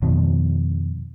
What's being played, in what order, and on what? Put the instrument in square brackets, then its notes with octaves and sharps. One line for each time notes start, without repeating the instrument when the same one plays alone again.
[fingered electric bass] F2 B2 D#3